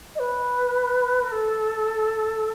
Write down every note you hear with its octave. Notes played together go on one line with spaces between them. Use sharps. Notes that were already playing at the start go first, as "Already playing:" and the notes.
D#5
B4
A#4
A4